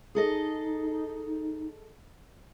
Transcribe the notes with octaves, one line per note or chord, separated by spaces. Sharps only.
D#4 G#4 A4 D#5